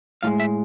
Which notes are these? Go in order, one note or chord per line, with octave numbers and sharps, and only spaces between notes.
A2 F3 G#3 F5
E5